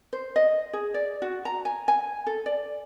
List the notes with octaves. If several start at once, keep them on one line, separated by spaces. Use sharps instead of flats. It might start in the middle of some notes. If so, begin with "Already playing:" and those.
C5
D#5
G#4
D5
F#4
A#5
G#5
G#5
A4
D5